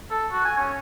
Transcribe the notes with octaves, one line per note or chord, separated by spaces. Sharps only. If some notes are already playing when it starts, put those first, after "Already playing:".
A4
F#4
G#5
C#4